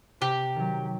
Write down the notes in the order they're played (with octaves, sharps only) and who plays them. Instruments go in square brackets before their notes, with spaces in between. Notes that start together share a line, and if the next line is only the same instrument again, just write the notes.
[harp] C3 [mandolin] G4
[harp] D#3 F#3